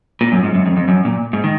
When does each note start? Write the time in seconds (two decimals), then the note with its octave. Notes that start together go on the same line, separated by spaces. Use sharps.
0.21 A#2
0.32 F#2
0.44 G#2
0.54 F#2
0.66 F2
0.77 F2
0.88 F#2
1.05 A#2
1.33 G#2
1.44 D#3